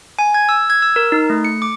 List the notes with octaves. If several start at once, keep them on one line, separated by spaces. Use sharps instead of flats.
G#5
G#6
E6
G#6
E6
A#4
D#4
A3
C#7
D6